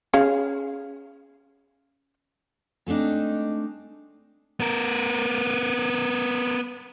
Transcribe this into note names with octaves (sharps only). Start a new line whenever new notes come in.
C#4 G#4 F5
G#3 A3 C4 D4 D#4
B3 A#4